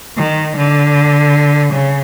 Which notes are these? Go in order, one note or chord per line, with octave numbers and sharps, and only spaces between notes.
D#3
D3
C#3